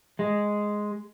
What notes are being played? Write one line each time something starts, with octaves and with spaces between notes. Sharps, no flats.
G#3